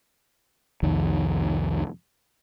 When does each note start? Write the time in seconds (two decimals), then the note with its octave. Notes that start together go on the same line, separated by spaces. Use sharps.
0.83 C2 F2 D#3